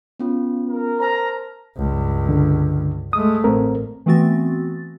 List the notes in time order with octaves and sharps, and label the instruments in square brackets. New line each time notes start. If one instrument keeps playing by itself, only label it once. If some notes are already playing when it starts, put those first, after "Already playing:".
[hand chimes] B3 C#4 F4
[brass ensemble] A#4
[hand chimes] C5 A5 F6 [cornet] A#5
[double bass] C#2 G2
[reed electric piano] D3
[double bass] G#3 A3 [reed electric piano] D#6
[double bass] A1 [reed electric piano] C4 A#4
[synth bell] E3 A3 B3 C4 F#4 A6